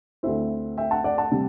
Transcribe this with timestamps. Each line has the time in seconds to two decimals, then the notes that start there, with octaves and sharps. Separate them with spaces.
0.23 D2 D3 A3 C4 E4 C5 E5
0.78 E5 G5
0.91 F#5 A5
1.04 D5 F#5
1.18 F#5 A5
1.32 C3 G3